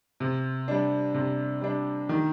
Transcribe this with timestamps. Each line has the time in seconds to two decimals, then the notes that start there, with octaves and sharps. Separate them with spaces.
0.20 C3
0.68 G3 D4
1.14 C3
1.61 G3 D4
2.09 D#3